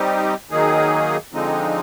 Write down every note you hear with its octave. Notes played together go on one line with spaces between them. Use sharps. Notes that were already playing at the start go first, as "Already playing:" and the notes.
Already playing: G3 C4 D#4 G4
D#3 F#3 A#3 D#4 G#4
D3 F3 G#3 C4 D#4